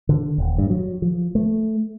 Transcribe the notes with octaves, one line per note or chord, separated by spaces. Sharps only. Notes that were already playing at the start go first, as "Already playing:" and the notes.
D3
D#1
G2
F#3
F3
A3